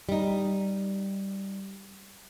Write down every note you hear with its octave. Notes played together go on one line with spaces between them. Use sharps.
G3 D#4